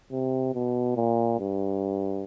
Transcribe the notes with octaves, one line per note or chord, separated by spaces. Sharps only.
C3
B2
A#2
G2